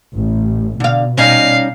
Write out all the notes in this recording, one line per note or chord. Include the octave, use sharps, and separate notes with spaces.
A1
B2 D3 F5
G3 C#4 D#4 F5